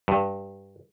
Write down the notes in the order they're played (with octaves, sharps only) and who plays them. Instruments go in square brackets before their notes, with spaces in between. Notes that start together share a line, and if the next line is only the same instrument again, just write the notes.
[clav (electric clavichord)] G2